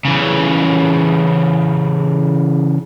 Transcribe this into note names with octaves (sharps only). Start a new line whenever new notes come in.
C#3 E3